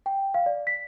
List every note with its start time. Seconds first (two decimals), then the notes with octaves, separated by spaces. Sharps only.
0.06 G5
0.34 F5
0.46 D5
0.67 B6